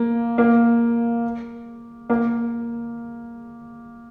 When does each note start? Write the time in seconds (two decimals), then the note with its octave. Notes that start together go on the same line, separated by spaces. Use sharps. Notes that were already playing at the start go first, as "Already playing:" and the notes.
Already playing: A#3
0.38 A#3
2.10 A#3